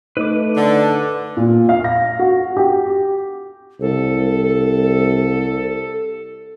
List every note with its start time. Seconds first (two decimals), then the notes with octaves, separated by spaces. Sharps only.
0.17 A3 D#4 B4 D6
0.56 D3
1.37 A#2
1.69 F5
1.84 A#6
2.19 F#4
2.57 G4
3.80 C2 A4